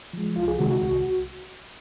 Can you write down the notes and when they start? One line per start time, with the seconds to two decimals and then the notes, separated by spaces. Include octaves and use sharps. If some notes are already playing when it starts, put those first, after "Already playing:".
0.13 F3 G#3
0.36 C2 F4
0.48 G#4
0.59 C3 D#3 G#3 F#4
0.70 F#4
0.82 C2